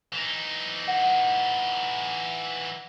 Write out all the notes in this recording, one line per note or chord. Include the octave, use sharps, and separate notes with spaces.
E3 D#4
F#5